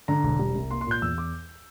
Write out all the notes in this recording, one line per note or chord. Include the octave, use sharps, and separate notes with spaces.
D3 A#5
E1
G3
C2
A#3 C6
C6
A#2 G6
E2 E6
D6